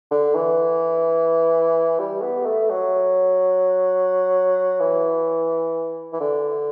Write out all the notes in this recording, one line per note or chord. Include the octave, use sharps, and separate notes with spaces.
D3
E3
G3
B3
A3
F#3
E3
E3
D3